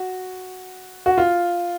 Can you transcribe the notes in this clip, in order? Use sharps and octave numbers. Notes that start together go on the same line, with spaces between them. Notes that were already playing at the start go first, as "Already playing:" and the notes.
Already playing: F#4
F#4
F4